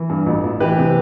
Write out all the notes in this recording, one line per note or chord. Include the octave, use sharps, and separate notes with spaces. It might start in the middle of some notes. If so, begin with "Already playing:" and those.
Already playing: E3
G2
A1
A1
E3 G4 B4
C3